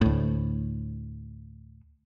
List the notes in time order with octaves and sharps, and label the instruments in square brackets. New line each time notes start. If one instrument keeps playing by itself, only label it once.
[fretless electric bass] D2 A2